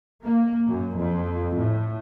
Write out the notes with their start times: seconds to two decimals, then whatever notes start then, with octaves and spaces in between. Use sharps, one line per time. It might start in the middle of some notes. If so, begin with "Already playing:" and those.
0.23 A#3
0.68 F#2
0.97 F2
1.57 A2